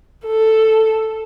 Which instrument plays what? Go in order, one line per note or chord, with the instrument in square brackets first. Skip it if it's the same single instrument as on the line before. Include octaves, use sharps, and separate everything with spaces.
[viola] A4